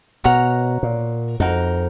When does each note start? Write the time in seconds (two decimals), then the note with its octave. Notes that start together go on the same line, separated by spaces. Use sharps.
0.24 B2 A#4 C#5 F#5 A#5
0.83 A#2
1.40 F2 D#4 F#4 A#4